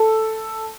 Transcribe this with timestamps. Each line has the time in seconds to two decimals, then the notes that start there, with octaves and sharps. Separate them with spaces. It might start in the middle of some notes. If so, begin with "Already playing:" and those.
Already playing: A4